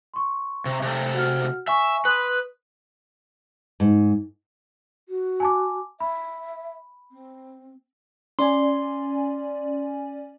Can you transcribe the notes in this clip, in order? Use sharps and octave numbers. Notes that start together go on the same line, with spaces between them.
C6 C#6
C3
C3 A3
F#4 F#5 F6
E5 G#5 C#6
B4 C6 D#6 F#6
G#2
F#4
G#5 A5 D6
E5 B5
C4
C#4 D5 G#5 C6